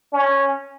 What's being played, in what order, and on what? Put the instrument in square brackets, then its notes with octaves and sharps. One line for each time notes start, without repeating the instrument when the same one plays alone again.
[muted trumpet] C#4